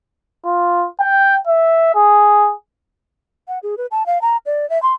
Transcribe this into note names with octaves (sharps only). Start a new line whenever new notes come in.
F4
G5
E5
G#4
F#5
G#4
B4
A5
F5
A#5
D5
E5
C6